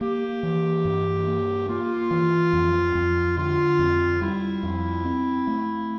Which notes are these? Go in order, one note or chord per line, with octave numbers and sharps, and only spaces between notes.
A#3 G4
E3
G2
A#3
A#3 F4
E3
F2
F2
D3 F4
F2
G3 E4
F2
C4
A3